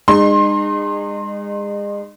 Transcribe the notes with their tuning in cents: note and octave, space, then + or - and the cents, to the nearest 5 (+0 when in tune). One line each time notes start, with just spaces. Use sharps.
G#3 -30 D#4 -35 C6 +25